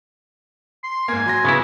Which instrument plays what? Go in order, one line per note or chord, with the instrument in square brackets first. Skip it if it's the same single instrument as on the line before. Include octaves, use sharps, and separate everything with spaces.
[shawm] C6
[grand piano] G#2 A#3 [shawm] G#5
[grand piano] F#3 C6 A#6
[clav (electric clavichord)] C#3 B3 E4